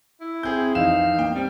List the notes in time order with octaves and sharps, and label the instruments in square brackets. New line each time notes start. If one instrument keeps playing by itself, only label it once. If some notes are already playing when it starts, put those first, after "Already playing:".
[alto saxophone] E4
[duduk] C4 [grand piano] G#4 G6
[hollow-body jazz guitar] F2 E3 D#5 [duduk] D#4 [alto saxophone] F5 [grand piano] E7
[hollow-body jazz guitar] A#3 C#4 [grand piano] G5
[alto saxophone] G3 [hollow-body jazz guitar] C4